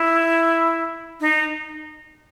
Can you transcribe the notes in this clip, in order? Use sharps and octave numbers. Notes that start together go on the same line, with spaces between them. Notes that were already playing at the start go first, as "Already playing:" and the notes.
Already playing: E4
D#4